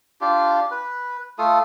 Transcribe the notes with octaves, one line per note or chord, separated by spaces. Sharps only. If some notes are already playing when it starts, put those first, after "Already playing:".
D4 F4 G4
B4
A3 F4 A4 D#6